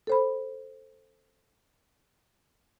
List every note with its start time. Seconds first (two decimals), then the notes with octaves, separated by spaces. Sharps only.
0.07 A4 C5 B5